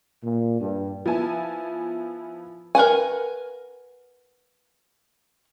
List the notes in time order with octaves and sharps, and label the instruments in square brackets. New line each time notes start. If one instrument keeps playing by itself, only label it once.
[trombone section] A#2
G2
[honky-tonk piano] F3 B3 E4 G#5 A5
[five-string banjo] A#4 B4 F#5 G#5